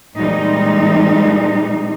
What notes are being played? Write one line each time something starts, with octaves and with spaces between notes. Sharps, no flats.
A#2 E3 G3 G#3 C4 D#4